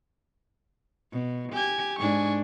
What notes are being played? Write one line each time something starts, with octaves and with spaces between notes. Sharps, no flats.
B2
G4 G#5 G#6
G#2 D4 G#5 C#6